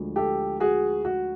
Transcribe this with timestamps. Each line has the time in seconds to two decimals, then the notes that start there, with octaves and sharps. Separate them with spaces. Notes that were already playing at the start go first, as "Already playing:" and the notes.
Already playing: D2 D3 F3 G#3
0.16 G4 A4
0.60 F#4 G#4
1.05 F#4